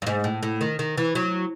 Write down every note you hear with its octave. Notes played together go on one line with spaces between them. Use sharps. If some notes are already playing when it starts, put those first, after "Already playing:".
G2
G#2
A2
A2
D#3
D#3
E3
F#3